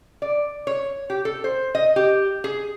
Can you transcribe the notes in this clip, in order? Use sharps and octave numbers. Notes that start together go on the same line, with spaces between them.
D5
C#5
G4
A4
C5
D#5
G4
G#4